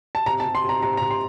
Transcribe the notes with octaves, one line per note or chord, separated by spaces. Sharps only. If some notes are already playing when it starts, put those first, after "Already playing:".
A5
C3 A#5
A5
C3
C6
C3
A#5
C3 A#5
A#5
C3
C6